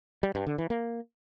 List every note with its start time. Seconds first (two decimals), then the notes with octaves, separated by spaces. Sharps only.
0.23 G3
0.35 G2
0.47 D3
0.58 E3
0.70 A#3